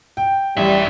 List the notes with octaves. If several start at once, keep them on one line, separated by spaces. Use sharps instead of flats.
G5
A1 F#2 G3 E5